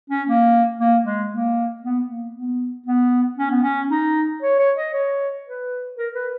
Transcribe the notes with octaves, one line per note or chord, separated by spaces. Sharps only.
C#4
A#3
A#3
G#3
A#3
B3
A#3
B3
B3
C#4
B3
C#4
D#4
C#5
C#5
D#5
C#5
B4
A#4
B4